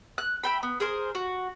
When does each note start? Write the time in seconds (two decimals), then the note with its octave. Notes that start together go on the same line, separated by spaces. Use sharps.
0.18 F#6
0.44 E5 G5 B5
0.63 B3
0.80 G#4 A#4 C5
1.15 F#4